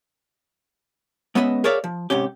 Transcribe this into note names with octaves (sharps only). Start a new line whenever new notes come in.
G#3 B3 C#4 B4 D#5 E5
G#4 A#4 C#5 D5 E5 F5
F3
G#2 C3 C#4 G4